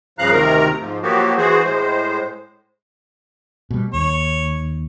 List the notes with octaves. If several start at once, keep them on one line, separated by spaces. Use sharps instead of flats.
G2 C#3 F3 F5 A#5 F#6
D2 C3 D#3 A#4 A#5
G#2 F3
F3 F#3 A#3 B3 F#4 G4
E3 F#4 G#4 C5
A2 G#3 C5
B2 G3
D#2 C#5